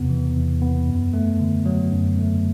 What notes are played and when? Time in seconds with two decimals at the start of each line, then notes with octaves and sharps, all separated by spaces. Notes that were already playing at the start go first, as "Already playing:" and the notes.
Already playing: E2 C3 B3
0.10 E3
0.36 E2
0.62 B3
0.88 F#2
1.14 A3
1.39 D3
1.66 F#3
1.92 F#2
2.18 A3